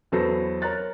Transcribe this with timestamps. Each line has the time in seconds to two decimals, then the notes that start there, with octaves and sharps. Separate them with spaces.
0.12 E2 F#3 A4 B4 C5 A#6
0.62 A#4 C#5 A#5 F#6 A6